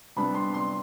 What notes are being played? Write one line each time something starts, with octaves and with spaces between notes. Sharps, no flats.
C3 G3 B3 D4 B5
C6
C6